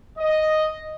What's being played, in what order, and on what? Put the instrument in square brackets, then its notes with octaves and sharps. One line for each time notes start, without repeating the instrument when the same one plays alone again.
[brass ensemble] D#5